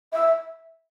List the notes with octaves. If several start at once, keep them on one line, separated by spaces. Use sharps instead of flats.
E5